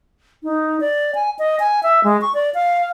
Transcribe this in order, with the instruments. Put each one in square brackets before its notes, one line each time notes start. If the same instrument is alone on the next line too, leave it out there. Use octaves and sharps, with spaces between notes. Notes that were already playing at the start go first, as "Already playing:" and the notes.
[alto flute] D#4
D5
G#5
D#5
G#5
E5
G#3
C#6
D5
F5